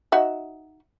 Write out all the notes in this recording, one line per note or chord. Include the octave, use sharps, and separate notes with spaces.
D#4 F#4 E5